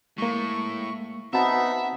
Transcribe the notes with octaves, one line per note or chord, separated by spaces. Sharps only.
A2 G#3 A#3 C#6
B3 C4 D#4 F#4 E5 F#5 A5